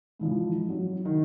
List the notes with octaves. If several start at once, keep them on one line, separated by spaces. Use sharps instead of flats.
G#2 E3 F3
F#3
D#3